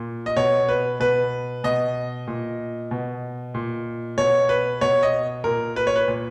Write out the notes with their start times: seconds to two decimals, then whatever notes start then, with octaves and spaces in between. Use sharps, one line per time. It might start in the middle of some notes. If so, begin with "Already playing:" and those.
Already playing: A#2
0.26 D#5
0.37 B2 C#5
0.69 B4
1.00 B2 B4
1.64 B2 D#5
2.27 A#2
2.91 B2
3.54 A#2
4.18 B2 C#5
4.49 B4
4.81 B2 C#5
5.03 D#5
5.44 A#2 A#4
5.76 B4
5.87 C#5
5.96 B4
6.08 A#2